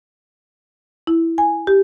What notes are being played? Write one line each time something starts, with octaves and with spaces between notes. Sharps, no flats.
E4
G#5
G4